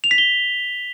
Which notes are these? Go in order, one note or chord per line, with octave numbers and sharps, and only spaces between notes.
F7
B6
G7